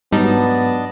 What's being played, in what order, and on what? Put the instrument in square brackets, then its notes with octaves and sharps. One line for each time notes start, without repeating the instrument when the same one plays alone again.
[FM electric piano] G#2 F#3 [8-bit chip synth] G3 D#4 [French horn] B3 [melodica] D4 D#5 A5